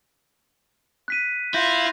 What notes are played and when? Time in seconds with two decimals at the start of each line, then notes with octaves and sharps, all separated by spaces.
1.08 F#6 B6 D#7
1.54 E4 F4 F5 G6 A#6